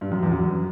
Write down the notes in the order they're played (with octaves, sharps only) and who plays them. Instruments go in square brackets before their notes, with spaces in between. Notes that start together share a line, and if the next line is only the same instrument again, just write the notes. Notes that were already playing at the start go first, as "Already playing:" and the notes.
[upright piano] G2
F#2
E2
F#2